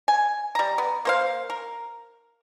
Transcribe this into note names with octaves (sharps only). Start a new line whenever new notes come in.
G#5
G3 A#5
B3
A#3 C5 F5
A#4